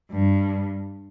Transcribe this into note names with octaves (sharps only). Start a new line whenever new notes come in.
G2